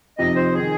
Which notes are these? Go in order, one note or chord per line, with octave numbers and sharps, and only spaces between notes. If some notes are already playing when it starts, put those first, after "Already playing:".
F2 C3 F3 C4 D#4 D#5
C5
D#3 G#4